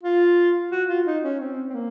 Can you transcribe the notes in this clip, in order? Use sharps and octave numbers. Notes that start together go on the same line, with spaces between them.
F4
F#4
F4
D#4
C#4
C4
C4
A#3